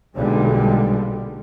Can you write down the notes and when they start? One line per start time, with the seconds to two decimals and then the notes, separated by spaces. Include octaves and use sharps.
0.16 B1 A#2 D3 G3 G#3